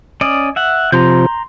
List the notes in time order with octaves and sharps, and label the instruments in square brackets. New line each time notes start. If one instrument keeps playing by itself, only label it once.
[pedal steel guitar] C#4 D5 D#5
E5 F#5
[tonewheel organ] C3 F3 [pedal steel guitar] A#5 C6 G6